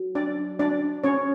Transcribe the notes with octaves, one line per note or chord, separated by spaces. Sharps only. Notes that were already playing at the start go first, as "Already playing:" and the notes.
Already playing: F#3
D4 D5
D4 D5
C#4 C#5